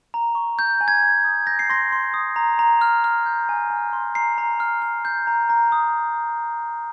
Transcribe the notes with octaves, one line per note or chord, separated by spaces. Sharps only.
A#5
C#6
G6
G#5
G#6
G#5
D#6
G6 A#6
C7
C6 A#6
C6
D#6
A#5
A#5
F6
F6
G6
G#5
G#5
C6
A#5 C7
A#5
F6
F6
G6
A#5
A#5
D#6